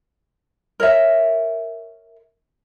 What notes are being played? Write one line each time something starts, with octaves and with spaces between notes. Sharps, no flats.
A#4 C#5 E5